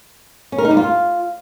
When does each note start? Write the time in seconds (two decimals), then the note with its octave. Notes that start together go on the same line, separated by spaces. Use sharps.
0.52 C#4
0.58 A#4
0.65 D#4
0.71 G3
0.77 F4